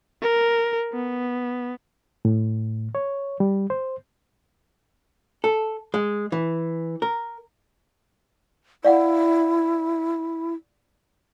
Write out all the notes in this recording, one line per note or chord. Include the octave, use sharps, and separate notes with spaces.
A#4
B3
A2
C#5
G3
C5
A4
G#3
E3
A#4
E4 D5 F5 F#5